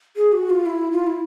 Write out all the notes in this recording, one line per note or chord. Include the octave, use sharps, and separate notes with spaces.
G#4
F#4
F4
E4
F4
E4